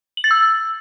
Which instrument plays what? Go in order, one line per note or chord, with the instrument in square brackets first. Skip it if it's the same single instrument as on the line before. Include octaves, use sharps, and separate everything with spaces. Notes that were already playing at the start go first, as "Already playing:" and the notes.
[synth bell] F#7
A6
E6